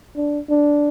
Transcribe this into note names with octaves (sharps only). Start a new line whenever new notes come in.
D4
D4